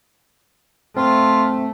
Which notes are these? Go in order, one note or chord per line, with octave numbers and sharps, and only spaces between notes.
A3 C4 F4